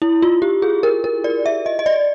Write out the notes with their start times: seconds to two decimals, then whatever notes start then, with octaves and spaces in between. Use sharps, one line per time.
0.02 E4
0.22 F4
0.42 G4
0.62 G#4
0.83 A#4
1.04 A#4
1.24 D5
1.46 E5
1.66 D#5
1.79 D#5
1.86 D5